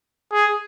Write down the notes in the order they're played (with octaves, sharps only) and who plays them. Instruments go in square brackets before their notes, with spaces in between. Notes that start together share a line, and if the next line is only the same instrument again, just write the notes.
[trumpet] G#4